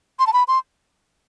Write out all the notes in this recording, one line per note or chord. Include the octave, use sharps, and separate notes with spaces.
C6
A5
B5
C6